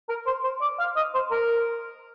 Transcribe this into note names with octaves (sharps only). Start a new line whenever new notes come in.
A#4
C5
C5
D5
F5
D#5
C5
A#4